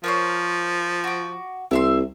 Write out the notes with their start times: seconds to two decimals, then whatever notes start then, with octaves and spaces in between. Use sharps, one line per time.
0.04 F3 A#4 C5 C#5
1.04 F#4 D6
1.71 C2 E4 E5 C6